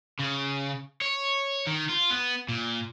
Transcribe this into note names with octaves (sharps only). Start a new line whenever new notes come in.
C#3
C#5
D#3
F4
B3
A#2